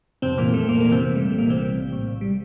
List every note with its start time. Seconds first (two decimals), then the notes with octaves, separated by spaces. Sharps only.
0.22 F2 C3 C4
0.38 A#2 E3 A#3
0.53 F2 A3
0.69 F2 A#2 A#3
0.80 E3 A#3
0.92 C3 C4
1.00 E3
1.15 G3 A3
1.27 A#1 A3
1.38 A#2 A#3
1.46 C3 E3 C4
1.62 G3
1.77 A#1
1.92 A2
2.08 A#1
2.21 G3